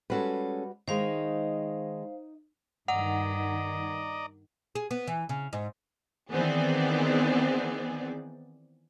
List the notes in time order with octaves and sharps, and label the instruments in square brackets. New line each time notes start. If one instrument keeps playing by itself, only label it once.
[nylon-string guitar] G3 F#4 B4 [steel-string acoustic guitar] G#3 C#4 A4
[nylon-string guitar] D#3 G#3 [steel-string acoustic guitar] D#4 [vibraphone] C5 F5
[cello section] G2 D#3 [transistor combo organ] D5 D#5 A#5 [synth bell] F#5
[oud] G#4
B3
E3
C#3
G#2
[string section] D#3 E3 B3 C4 G#4 D5